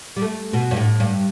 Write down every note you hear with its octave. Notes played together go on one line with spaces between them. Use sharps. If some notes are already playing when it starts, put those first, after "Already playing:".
G3
A3
B2
G2
A2
G2